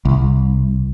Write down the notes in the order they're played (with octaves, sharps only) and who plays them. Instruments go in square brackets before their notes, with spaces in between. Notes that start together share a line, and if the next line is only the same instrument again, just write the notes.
[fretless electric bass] C2